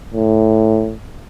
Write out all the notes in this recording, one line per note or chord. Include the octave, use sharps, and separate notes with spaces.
A2